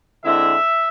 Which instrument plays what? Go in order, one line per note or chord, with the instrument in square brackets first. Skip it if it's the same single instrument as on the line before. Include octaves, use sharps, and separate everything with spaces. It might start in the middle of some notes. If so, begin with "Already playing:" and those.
[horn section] D3 G#3 C4 E4 E5